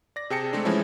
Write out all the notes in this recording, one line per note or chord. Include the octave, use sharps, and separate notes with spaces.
D5 A#6
C3 G#4 G5 A5 C#7
G#3 A3 C4 D4
E3 F3 G#3 C#4 E4